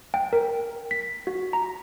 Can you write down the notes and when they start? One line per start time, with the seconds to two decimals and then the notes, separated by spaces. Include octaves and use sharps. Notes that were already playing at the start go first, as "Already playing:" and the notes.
0.14 G5
0.33 A#4
0.91 B6
1.27 F#4
1.53 A#5